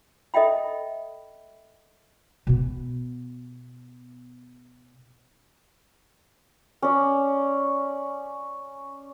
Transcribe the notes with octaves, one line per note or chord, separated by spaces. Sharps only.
A4 D#5 E5 G5 B5
B2 B3
C#4 D5